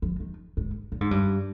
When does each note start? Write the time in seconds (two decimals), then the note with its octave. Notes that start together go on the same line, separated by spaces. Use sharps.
0.02 F3
0.20 D#3
0.57 G#2
0.92 A#2
1.01 G#2
1.11 G2